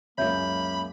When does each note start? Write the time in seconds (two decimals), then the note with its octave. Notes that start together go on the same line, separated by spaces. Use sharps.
0.18 C#2 F#2 A#3 C#5 E5 B5 G6